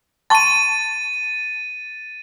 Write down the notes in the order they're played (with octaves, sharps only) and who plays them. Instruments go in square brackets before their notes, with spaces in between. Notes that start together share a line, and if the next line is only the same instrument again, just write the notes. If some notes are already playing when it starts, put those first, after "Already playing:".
[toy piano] A5 C6 C#6 [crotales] A6 D#7